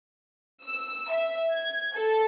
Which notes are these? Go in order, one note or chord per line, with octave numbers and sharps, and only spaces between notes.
E6
E5
G#6
A4